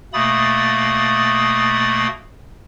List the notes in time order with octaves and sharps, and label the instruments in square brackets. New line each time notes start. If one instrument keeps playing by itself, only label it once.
[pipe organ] B2 A3 A#3 B5 D#6 A6